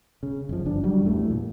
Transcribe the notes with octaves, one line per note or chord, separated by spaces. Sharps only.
C#3
F#1 F3
G1 D4
F#3 G3
A1 E2 A2 A3
A#2